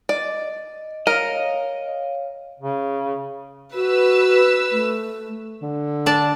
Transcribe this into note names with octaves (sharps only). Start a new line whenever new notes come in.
D5 D#5
A#4 C#5 D#5 F5
C#3
F#4 B4 E6
A3
D3
D4 D5 A5